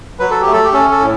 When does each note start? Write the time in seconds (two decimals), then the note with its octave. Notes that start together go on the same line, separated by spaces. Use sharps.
0.19 F#3 B4
0.31 A4
0.41 G4
0.47 A3
0.53 A4
0.64 G4
0.73 C#4 A4
0.91 A4
1.00 A2